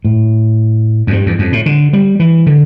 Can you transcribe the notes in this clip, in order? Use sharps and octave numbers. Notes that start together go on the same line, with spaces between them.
A2
F2
G2
E2
F2
A2
D3
G3
E3
D3